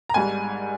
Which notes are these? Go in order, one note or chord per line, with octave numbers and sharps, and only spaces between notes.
A#5
G#1 G#2 G3 G#5